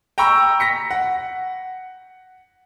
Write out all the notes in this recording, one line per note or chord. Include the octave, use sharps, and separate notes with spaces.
G5 A#5 B5 C#6 E6
A#6 B6 C#7
F#5